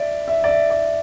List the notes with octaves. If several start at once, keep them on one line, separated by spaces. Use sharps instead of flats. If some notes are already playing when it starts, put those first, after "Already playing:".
Already playing: D5 E5
E5
D5
E5
D5